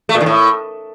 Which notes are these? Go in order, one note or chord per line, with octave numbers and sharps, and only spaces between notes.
A3
A#2
D#3
A2